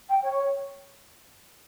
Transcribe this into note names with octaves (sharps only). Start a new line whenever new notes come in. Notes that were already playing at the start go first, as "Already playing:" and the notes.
G5
C#5